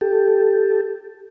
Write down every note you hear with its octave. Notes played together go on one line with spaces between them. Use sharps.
G4 A4